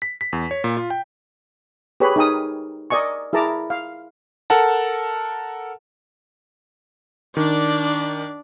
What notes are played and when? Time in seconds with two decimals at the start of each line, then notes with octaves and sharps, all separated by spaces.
0.02 B6
0.21 B6
0.33 E2
0.51 C#5
0.64 A#2
0.77 F4
0.90 G5
2.00 G4 G#4 B4 C#5 B5
2.16 D#4 G#4 A#4 G5 G#5 D#6
2.90 A#4 D5 D#5 G#5 C#6
3.33 E4 G#4 A#4 A5 A#5 D6
3.70 F5
4.50 A4 A#4 F#5 A5
7.37 D#3 D4 D5